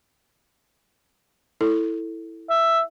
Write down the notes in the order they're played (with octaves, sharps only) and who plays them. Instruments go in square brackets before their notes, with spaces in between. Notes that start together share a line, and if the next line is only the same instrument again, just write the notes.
[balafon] E4 A4
[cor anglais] E5